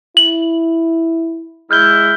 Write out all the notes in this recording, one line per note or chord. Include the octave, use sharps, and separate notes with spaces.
E4 F#7
G#3 E4 F6 G6 G7